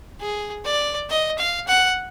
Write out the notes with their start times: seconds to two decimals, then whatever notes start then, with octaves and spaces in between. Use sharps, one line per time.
0.20 G#4
0.65 D5
1.10 D#5
1.39 F5
1.68 F#5